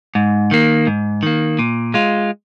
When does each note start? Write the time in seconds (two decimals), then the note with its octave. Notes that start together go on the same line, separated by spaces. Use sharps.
0.15 G#2
0.51 D#3 A#3
0.87 G#2
1.23 D#3 A#3
1.59 A#2
1.94 G#3 F4